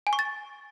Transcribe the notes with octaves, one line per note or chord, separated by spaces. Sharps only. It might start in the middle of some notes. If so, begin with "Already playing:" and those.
G#5
C#6
A6